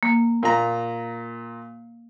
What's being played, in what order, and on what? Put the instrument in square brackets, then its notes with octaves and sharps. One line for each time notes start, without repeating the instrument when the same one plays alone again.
[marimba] A#3
[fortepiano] A#2 A#5